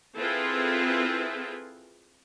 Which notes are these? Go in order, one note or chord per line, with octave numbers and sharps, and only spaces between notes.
C4 E4 F4 G#4 A4 B4